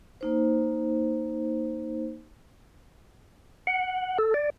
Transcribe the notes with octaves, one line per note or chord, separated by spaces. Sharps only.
A#3 D#4 C5
F#5
A4
D5